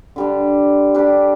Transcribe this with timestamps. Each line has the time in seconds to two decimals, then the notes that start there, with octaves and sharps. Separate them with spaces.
0.16 D3 G3 D4
0.94 G3 D4 G4